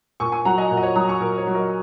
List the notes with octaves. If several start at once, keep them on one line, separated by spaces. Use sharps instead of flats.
A#2 G#5 C#6
G#5 C#6
F#3 F#5 A#5
D#5 G#5
A#2
D#5
C#5
F#3 A#5 D#6
G#5 C#6
A#2 A#4
C#5
F#3
A#4 D#5